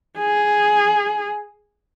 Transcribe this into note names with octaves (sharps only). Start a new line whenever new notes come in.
G#4